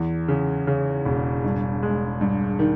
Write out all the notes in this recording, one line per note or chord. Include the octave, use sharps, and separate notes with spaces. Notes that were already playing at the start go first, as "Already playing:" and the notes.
Already playing: E2
C#3
C#3
E1
G2
G#3
G2
D#3